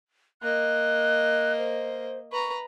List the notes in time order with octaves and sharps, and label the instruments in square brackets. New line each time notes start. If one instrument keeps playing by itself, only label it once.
[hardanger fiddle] A#3 D#5 [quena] F#6
[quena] C5
[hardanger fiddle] B4 A#5 [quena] C#6